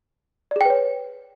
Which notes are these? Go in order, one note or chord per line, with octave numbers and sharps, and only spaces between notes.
G#4 B4 C#5 D5 G5